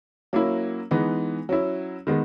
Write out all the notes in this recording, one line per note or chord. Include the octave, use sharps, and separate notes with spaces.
F#3 A#3 C#4 E4
E3 G#3 B3 D#4
F#3 C#4 E4
D#3 G#3 B3